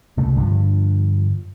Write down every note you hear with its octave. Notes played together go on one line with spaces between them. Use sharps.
C2 C#3 A3
G2 D3 E3 F3